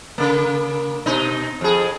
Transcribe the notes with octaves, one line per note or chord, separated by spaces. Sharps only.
C#3 A#3
B2 D#4
F2 G#4